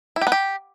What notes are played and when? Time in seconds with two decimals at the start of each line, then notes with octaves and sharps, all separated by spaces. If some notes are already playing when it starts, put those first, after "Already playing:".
0.16 E4
0.21 G4
0.27 B3
0.32 G4